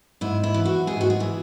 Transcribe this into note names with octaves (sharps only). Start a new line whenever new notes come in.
G#2 E4
E4
E3
F#4
G#2 G#4
F#4
G#4
E3